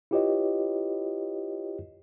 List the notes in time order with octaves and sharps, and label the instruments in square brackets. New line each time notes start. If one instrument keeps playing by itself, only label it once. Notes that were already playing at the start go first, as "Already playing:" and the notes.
[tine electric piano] E4 F4 G4 B4 C#5 D#5